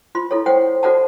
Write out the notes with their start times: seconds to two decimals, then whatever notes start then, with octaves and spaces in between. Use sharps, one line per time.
0.15 F4 C6
0.31 E4 A4 C#5
0.46 C5 C#5 F#5 G5
0.83 F#4 A4 C5 D5 F#5 A5